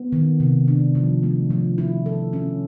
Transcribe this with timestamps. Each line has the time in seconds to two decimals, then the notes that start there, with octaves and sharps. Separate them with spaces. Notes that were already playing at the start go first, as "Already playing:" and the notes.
Already playing: B3
0.12 D#3
0.40 C3
0.68 D4
0.95 F3
1.23 A3
1.50 F3
1.78 E4
2.06 A4
2.33 C#4